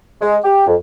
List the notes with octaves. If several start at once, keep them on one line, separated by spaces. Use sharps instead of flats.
G#3
G4
F2